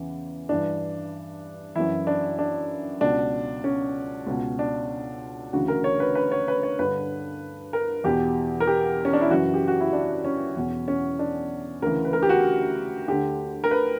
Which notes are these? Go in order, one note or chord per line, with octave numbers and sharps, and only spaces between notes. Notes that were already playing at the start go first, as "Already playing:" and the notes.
Already playing: E2 C#3 E3
G2 E3 D4
F#2 E3 E4
D4
D4
C#2 B2 D4
C#4
C#2 B2
D4
D2 C#3 E3 F#4
A#4
C#5
B4
B4
C#5
B4
C#5
G2 D3 B4
A#4
E2 B2 G4
A#4
G4
C#4
D4
E4
F#2 C#3 E3 F#4
G4
F#4
E4
D4
C#4
E2 B2
C#4
D4
D2 C#3 E3 A#4
B4
A#4
G4
F#4
D2 D3 G4
A#4
B4